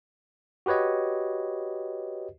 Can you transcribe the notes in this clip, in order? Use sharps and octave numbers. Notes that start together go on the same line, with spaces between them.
F#4 G4 B4 C#5 D#5